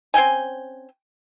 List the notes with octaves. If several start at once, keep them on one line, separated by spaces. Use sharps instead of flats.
C4 C#4 G5 G#5